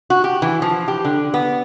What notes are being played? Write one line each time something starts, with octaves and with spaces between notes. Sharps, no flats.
F#4
G4
E3
F3
G4
D3
B3